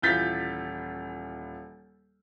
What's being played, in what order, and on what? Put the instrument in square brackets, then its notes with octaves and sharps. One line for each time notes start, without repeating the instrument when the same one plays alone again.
[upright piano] D#1 E3 F4 G6 A6 B6